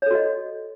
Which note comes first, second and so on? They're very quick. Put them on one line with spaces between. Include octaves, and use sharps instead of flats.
C#5 A4 F#4 D#5